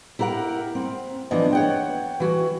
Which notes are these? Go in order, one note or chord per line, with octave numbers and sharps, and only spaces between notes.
E4 G4 A#4 C#5 F#5
C4
E3 F3 B3 D4 D#5
C#5 F#5 G5
E3 F#4